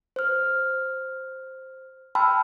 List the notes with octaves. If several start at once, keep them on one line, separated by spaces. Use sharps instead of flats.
C5 F6
G5 A5 B5 C6 E6 F6